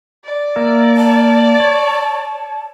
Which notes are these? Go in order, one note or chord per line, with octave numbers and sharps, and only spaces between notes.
D5
A#3 A#4 E5
A5
C#5